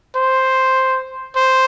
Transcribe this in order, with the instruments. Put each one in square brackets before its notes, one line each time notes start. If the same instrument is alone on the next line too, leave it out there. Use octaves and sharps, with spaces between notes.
[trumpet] C5
C5